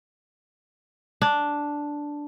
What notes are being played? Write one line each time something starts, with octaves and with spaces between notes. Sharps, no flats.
D4